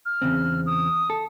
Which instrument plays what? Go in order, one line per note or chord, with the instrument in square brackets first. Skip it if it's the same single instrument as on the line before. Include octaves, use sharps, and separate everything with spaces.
[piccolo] F6
[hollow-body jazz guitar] E2 C#3 C4
[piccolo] D#6
[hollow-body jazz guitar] A4